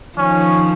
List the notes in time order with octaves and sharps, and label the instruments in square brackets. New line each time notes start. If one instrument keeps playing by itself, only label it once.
[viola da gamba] D#3 F3 [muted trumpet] C#4